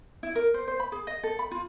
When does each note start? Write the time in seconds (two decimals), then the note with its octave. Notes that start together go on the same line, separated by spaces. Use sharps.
0.23 E4
0.35 A#4
0.54 C5
0.68 C5
0.80 B5
0.92 G#4
1.07 D#5
1.23 A4
1.39 B5
1.51 F4